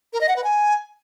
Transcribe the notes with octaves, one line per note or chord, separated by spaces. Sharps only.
A#4
D#5
F#5
B4
G#5